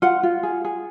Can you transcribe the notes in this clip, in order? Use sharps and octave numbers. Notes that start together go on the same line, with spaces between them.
F4 F#5
F4
G#4
G#4